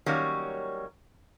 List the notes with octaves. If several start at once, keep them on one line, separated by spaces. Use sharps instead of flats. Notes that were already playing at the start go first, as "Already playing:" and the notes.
D#3 F#3 G3 A#3 C#4